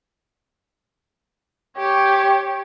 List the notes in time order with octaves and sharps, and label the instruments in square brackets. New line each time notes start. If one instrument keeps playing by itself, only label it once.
[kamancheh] G4 C#5